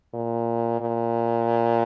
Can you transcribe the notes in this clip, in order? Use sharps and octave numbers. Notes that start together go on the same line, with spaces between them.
A#2
A#2